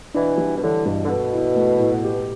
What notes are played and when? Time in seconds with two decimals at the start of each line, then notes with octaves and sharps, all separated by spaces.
0.14 B2 E3 D4
0.38 G3
0.56 B2
0.62 A2 D3 E3
0.85 G2 B2
1.05 D3
1.09 B2 A4
1.33 E4
1.56 A3
1.79 A2
2.04 G4